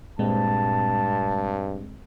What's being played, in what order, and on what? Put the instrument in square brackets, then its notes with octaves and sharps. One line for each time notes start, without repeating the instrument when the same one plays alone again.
[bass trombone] G2 [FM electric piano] A#2 G#3 C4 [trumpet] A5